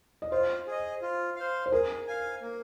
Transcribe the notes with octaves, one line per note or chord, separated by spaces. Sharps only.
D#5
F4 C5
G#4 D#5
F4
C5 F5
C5
G#4 A#4
F5 G#5
A#3